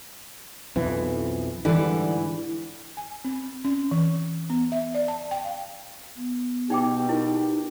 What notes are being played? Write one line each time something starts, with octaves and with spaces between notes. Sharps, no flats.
B1 F2 E3
G#2 D3 E3 G3
G#5
C4
C#4
E3
B3
E5
D5
A5
G5
F5
B3
B2 D#4 G4 G5 D6
D#4 E4 A#4